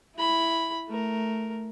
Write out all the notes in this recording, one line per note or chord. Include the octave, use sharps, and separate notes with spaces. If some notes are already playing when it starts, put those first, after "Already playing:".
E4 B5
A3 A#4